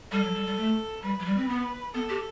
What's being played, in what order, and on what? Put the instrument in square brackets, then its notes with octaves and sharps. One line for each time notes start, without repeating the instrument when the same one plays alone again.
[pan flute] G3 [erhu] A4
[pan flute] F#3
G3
G3
A3
[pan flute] G3 [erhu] B4
[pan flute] F#3
G3
C4
B3
[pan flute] B3 [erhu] A4
[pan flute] G4